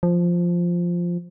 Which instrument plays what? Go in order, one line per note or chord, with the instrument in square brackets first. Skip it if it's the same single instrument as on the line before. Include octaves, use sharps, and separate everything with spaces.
[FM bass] F3